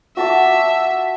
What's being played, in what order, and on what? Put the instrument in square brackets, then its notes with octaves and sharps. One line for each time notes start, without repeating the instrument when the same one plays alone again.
[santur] F#4 A5 D6 [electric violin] E5